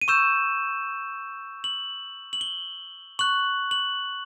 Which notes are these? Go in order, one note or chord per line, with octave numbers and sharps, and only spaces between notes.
D#7
C#6 E6 G6 E7
F#7
F#7
G7
C#6 F#6 F#7
F#7